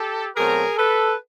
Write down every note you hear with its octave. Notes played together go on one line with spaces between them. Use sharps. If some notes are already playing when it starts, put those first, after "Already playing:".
Already playing: G4 A4
B2 F#3 A3 C4 G#4 A#4
A4 B4